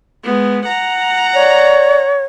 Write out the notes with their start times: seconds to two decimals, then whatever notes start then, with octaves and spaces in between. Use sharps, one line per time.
0.24 G#3 B3
0.66 F#5 A#5
1.34 C#5 D5